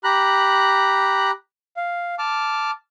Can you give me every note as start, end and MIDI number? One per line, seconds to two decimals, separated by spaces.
0.04 1.31 67
0.04 1.31 82
0.04 1.31 83
0.04 1.31 90
1.77 2.15 77
2.19 2.71 81
2.19 2.71 86
2.19 2.71 89